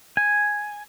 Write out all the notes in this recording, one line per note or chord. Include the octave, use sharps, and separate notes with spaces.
G#5